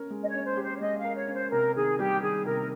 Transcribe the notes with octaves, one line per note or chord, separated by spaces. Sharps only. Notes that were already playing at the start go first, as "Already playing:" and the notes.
Already playing: C#4 A#4
G#3
D#5
C#5
C#4
C5
G4
C5
C#5
G#3 D#5
F5
A#4
C#5
C#4
C5
C3 A#4
D#3 G#4
G3 G4
D#3 G#4
C3 A#4